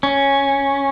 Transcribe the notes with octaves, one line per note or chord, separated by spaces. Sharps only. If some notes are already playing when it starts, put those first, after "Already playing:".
C#4